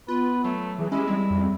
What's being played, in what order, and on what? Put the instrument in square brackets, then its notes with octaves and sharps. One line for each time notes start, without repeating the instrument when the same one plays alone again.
[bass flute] B3 [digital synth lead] F4 [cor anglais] B4
[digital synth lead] F#3 [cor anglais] A3
[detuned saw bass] E3 [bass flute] G#4
[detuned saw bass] G#3 [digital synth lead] C#4 [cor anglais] E4 [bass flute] G4
[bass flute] G3 [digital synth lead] C4
[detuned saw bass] F2